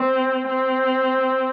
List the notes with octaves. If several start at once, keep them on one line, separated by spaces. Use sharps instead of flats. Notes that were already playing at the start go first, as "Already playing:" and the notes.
Already playing: C4
C4